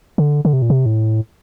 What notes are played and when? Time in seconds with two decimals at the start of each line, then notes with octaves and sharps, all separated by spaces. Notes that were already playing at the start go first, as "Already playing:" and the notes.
0.18 D3
0.45 D3
0.53 C3
0.62 A#2
0.70 C3
0.86 A2